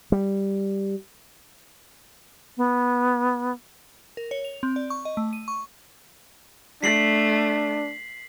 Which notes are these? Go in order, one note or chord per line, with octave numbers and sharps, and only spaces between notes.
G3
B3
A#4
C#5
F7
C4
D5
C#6
D#5
A3
D#7
C#6
A3 D4 B6 C7 F#7